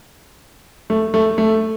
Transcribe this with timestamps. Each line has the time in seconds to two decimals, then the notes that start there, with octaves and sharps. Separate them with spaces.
0.90 A3
1.14 A3
1.38 A3